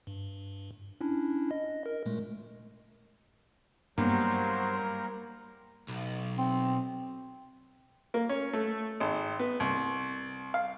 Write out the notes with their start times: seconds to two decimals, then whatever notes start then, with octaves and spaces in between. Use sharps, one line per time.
0.07 G2
1.01 C#4 D4 E4
1.51 D#5
1.86 A#4
2.06 A#2 G#3 A3
3.98 G2 F#3 G3 A#3 B3 A#4 C5
5.88 B1
6.38 C4
8.14 A#3
8.29 C#4
8.53 A3
9.00 G#1
9.40 B3
9.60 C2
10.54 F5